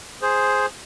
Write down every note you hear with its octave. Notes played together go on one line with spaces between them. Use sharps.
G#4 C5